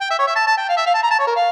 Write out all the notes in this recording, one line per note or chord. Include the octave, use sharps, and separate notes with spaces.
G5
E5
C#5
E5
A5
A5
G5
F5
E5
F5
A5
A#5
A5
C#5
A#4
F5